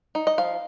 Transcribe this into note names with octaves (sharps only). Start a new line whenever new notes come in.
D#4
D#5
F3 F5